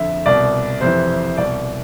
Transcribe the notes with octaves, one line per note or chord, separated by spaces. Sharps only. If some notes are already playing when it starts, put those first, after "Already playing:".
Already playing: F2 D3 E5
C2 B2 D5
F2 C3 E3 C5
C2 B2 D5